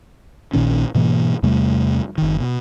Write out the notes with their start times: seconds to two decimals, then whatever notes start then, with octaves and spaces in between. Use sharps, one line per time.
0.53 A#1 A#2 D#3 C#4
0.95 G#2 B2 E3 A#3
1.43 E2 C3 G3 A3
2.18 F#1 D#3
2.40 B2